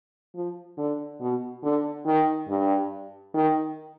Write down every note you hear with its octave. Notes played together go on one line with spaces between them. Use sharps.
F3
D3
B2
D3
D#3
G2
D#3